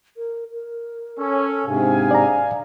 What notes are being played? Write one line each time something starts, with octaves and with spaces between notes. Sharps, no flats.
A#4
A#4
C#4 A4
G#2 C3 D4 G#4 F5 G#5
D5 A#5